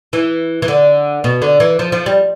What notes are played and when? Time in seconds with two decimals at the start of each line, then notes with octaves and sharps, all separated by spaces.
0.13 E3
0.62 E3
0.68 D3
1.24 B2
1.42 D3
1.60 E3
1.79 F3
1.92 F3
2.06 G3